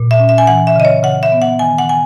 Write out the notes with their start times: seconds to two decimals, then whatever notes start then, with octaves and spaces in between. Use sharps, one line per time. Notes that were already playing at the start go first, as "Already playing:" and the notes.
Already playing: A#2
0.11 E5
0.20 C#4
0.29 E5
0.38 G#5
0.47 E3 F#5
0.67 E5
0.76 C#3 D#5
0.85 C#5
1.03 C#3 F#5
1.23 E5
1.32 B3
1.42 F#5
1.59 D#3 G#5
1.78 F#5
1.89 G#5